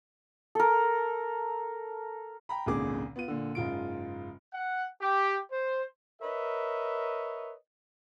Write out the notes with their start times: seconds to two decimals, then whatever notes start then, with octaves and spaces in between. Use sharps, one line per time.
0.55 A4 A#4
2.49 G5 A#5 B5
2.66 G#1 C#2 A#2 D3 G#4 D6
3.16 B3 F4 D#7
3.28 A#2 D3
3.55 F#1 G#2 F4 D7
4.53 F#5
5.01 G4
5.51 C5
6.22 A#4 B4 C#5 D#5 E5